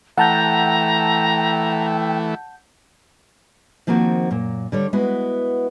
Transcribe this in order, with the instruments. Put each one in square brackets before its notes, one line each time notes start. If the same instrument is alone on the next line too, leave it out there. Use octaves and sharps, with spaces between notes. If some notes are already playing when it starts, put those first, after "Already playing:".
[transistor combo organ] E3 A3 [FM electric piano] F#5 A5 G6 [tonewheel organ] G5 [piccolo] A#5
[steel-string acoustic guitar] D#3 F3 A#3 C4 F4 F#4
F#2 A#2
D3 G3 C#5
G#3 B3 E4 F#4